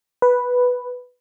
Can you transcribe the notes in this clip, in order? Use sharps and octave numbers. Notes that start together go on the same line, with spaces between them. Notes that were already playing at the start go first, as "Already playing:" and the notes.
B4